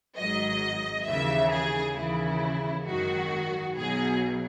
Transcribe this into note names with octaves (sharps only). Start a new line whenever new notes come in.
G#1 G#2 F#3 D#5
D#2 C#3 E3 E5
G#4
D#2 C#3 E3 E4
G#1 F#2 D#3 F#3 F#4
B1 B2 F#3 G#4